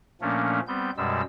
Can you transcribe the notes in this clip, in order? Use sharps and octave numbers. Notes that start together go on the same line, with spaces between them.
A#2 F3 A3 A#3 C#4 D4
G3 B3 C4 G6
F#2 B2 G3 G#3 E6